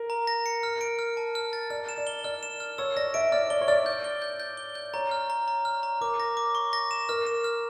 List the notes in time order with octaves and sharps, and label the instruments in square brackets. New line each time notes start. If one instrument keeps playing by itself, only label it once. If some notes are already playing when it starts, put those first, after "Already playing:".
Already playing: [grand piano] A#4
[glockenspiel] A#5
A#6
C#7
F6
D7
F6
A5
F6
A6
[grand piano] D5 [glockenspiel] F6
[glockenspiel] E7
[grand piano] D5
[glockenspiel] G7
[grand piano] D5 [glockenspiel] F6
[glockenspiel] E7
F6
[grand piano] C#5 [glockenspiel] E6
[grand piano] D5 [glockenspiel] A#6
[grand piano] E5 [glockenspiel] D7
[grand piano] D5 [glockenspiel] F6
[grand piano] D5 [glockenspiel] G7
[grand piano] C#5
[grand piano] D5 [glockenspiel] F6
[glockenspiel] G6
G7
G6
G6
G7
G6
[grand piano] C#5 [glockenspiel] A#5
[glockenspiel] F6
A#5
A#5
F6
A#5
[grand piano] A#4 [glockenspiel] D6
[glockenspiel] A#6
D6
C#6
A#6
E7
[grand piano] A#4 [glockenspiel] F6
[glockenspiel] E7
F6